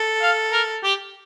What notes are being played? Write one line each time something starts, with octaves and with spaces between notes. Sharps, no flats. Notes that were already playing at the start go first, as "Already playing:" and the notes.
Already playing: A4
F5
A#4
G4